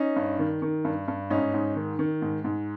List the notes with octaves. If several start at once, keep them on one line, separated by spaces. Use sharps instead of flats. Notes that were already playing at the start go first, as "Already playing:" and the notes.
Already playing: C#4 D#4
G2
D#3
D#3
G2
G2
G#2 C#4 D#4
G#2
D#3
D#3
G#2
G#2